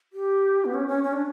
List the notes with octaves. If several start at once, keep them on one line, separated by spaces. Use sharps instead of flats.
G4
B3
C#4
C#4
C#4
D4